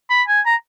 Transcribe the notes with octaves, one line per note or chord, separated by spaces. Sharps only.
B5
G#5
A#5